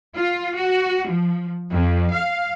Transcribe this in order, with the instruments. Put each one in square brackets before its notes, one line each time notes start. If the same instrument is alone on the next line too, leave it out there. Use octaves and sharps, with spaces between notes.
[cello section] F4
F#4
F3
F2
F5